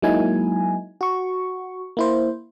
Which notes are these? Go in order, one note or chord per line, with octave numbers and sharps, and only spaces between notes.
F#3 G#3 A#3 D#4 E4 G#5
F#4 C#6
A#3 E4 C5